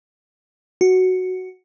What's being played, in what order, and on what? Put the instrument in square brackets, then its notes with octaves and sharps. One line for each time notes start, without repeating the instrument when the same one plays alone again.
[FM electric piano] F#4